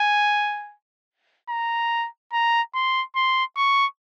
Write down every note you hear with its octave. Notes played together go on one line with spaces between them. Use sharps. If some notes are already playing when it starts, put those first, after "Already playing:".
Already playing: G#5
A#5
A#5
C6
C6
C#6